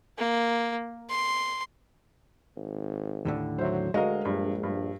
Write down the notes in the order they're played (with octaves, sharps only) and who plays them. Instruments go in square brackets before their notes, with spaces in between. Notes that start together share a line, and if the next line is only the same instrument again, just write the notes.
[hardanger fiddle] A#3
C6
[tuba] G#1
[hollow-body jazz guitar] D#2 A2 D3
[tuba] F#3 [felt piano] C5 E5
[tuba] D2 [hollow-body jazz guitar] G#3 A#4 [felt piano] F#4 D#5 F5
[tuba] A#1 [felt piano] G2
[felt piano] G2